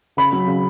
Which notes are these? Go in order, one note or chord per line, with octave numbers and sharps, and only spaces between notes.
C#3 B5
F#3
C#3